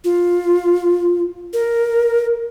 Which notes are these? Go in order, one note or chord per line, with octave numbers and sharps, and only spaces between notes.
F4
A#4